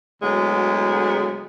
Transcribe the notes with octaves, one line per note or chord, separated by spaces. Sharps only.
D2 F#3 G#3 B3 E4